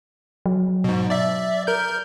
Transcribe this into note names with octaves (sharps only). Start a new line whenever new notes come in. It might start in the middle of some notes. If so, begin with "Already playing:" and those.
F#3
G#2 B2
D5 E5
A#4 G6